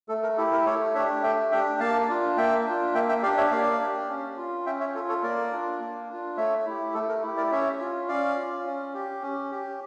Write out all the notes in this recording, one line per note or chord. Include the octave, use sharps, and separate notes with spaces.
A3 A4
A#4
E4 G4 A4
A#4
A3 A4 C#5
D4 G4 C#5 E5
A3 E5 G5
D4 G4 E5 G5
A#3 F5 A5
D4 F4
A#3 E5 G5
D4 F4
A#3 E5 G5
E5 G5
D4 G4 D5 F5
C#5 E5
A#3 D5 F5
D4 G4
C#4
F4
C#4 E5 G5
C#5 E5
F4 A4 C#5
A4 C#5
A#3 A#4 D5
D4 F4
A#3
D4 F4
A3 C#5 E5
E4 G4
A3 A4
A#4
E4 G4
A#4 D5
C#4 C#5 E5
F4
C#4 D5 F5
F4
C#4
G4
C#4
G4